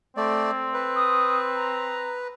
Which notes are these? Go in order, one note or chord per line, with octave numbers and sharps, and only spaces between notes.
A3 C4 D5
B4
D#6
A#5